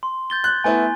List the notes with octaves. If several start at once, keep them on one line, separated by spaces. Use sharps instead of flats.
C6
G6 A6 G7
F#6
A3 B3 E4 G#5